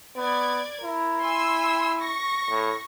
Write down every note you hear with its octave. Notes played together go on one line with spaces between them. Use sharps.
B3 D5 G#6
E4 A#4
G#5 C6 E6
C#6 A#6
A2